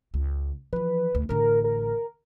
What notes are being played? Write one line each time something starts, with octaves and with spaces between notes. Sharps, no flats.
C#2
E3 F3 B4
D2
A1 D3 A#4
A#4